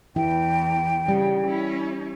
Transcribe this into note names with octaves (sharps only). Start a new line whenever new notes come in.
E2 E3 E4 G5
C#3 G3
C#4 E4